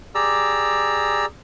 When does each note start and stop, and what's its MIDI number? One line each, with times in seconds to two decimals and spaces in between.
0.15 1.26 67
0.15 1.26 68
0.15 1.26 74
0.15 1.26 82
0.15 1.26 88